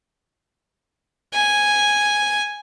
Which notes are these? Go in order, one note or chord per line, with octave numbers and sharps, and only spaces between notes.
G#5